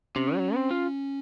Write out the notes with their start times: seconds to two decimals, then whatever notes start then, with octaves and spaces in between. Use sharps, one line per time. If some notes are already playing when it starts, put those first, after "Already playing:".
0.16 C3 C#4
0.35 G3
0.39 F#3
0.55 C4
0.71 F4